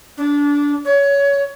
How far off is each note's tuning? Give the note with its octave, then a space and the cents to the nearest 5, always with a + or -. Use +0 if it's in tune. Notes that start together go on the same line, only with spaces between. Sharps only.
D4 -20
C#5 +20